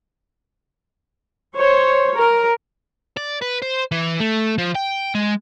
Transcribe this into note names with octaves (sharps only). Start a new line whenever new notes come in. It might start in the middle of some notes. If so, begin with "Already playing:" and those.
C5 C#5
A#4
D5
B4
C5
E3
A3
F3
G5
G#3